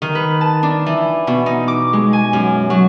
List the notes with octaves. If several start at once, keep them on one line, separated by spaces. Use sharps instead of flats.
D#3
B4
A5
D4
E3
B2
D#4
D6
G#3
G#5
F#2
F#3